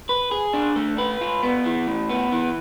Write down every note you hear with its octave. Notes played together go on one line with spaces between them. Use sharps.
B4
G#4
D4
A3
B4
F4
B3
E3
A2
B3
E3